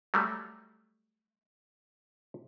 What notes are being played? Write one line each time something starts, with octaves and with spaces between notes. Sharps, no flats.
F#3 G3 A3